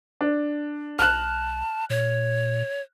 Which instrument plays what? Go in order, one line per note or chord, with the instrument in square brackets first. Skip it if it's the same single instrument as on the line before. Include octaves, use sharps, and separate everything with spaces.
[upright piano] D4
[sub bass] B1 [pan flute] A5 [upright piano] F6 F#6
[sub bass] A#2 [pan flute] C#5